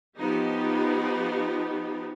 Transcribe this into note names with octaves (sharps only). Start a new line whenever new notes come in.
F3 B3 D#4 G4